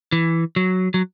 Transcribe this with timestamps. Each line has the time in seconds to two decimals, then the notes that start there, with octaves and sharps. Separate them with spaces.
0.12 E3
0.56 F#3
0.94 F#3